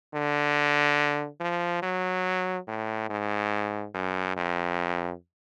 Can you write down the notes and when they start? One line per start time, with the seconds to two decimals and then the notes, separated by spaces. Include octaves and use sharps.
0.14 D3
1.41 F3
1.82 F#3
2.67 A2
3.10 G#2
3.94 F#2
4.36 F2